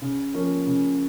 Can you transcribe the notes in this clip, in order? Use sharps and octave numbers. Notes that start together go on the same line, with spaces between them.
C#3
F3 A#3 C#4
C#3